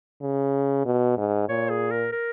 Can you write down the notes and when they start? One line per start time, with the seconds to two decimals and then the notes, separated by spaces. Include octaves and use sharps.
0.21 C#3
0.85 B2
1.17 G#2
1.49 A#2 C#5
1.70 G#4
1.91 A#4
2.12 A#4